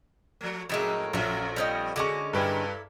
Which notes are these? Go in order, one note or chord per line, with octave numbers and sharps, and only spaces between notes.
F3 A3
F2 A2 G#3 A#3 A4 E5
A#1 F2 F#3 C#4 A4 E5
G3 C4 C#4 D#5
D3 G#3 C#4 F#4 C#6 D6
G2 A#3 E4 A4 B4 G5